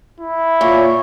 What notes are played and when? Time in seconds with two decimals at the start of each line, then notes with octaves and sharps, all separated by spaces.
0.20 E4
0.61 A#2 C#5